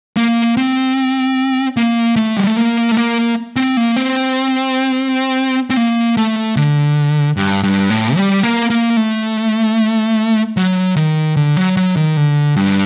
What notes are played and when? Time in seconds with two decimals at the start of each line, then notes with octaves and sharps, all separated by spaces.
0.17 A#3
0.57 C4
1.77 A#3
2.16 A3
2.37 G3
2.47 A3
2.57 A#3
2.92 A3
2.97 A#3
3.56 C4
3.77 A#3
3.97 C4
5.70 C4
5.77 A#3
6.17 A3
6.57 D3
7.37 G2
7.63 G2
7.90 A2
8.16 G3
8.43 A#3
8.70 A#3
8.97 A3
10.57 F#3
10.96 D#3
11.37 D3
11.57 F#3
11.77 F#3
11.96 D#3
12.17 D3
12.57 G2